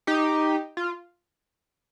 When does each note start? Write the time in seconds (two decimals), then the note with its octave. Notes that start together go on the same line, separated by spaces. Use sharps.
0.07 D#4 G4
0.77 F4